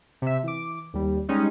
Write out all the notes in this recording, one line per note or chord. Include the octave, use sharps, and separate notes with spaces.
C3 E5
E3 D6
D#2 G3
G3 G#3 C#4 D#4